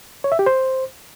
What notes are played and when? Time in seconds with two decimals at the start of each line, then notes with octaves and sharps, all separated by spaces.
0.24 C#5
0.32 E5
0.39 G4
0.46 C5